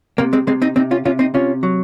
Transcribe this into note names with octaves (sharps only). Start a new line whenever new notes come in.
C3 A#3
G#3 C4
C3 G#3 C4
C4 D#4
C3 C4 D#4
C#4 F4
C3 C#4 F4
C4 D#4
C3 C#4 F4
F#3